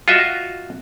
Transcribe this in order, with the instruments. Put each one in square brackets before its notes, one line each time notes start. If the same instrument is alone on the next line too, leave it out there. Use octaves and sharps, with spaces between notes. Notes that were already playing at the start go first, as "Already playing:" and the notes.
[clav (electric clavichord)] F4 F#4 D#5 E5